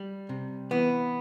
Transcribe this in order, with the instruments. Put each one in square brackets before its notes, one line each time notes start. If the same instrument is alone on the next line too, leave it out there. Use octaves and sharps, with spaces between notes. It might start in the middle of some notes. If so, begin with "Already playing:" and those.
Already playing: [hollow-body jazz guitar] G3
C3
E3 B3